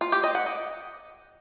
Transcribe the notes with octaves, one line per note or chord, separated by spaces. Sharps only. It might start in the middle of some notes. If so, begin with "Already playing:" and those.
F4
G4
D#5
F#5
D#5